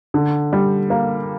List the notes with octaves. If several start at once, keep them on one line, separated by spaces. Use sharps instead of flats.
D3
G3
A#3